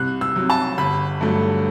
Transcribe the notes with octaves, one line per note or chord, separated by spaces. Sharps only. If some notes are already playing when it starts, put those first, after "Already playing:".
Already playing: C2 F#6
E6
C3 F#3
A5
G1 B5
G2 F#3 A3